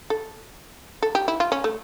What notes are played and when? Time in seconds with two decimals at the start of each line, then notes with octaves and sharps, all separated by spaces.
0.10 A4
1.02 A4
1.15 G4
1.28 E4
1.40 F4
1.52 C#4
1.64 A3